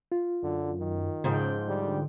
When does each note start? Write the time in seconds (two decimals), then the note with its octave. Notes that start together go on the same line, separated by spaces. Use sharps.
0.12 F4
0.43 F#2 D3
0.80 D#3
1.24 G#2 C#3 F3 G5
1.69 D3 G3